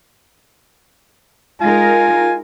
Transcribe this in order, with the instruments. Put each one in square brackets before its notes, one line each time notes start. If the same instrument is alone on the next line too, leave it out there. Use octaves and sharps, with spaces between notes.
[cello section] G#3 D#4 A#4 [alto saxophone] F4 [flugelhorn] G#5